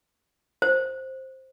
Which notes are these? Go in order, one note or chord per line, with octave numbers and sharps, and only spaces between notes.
C5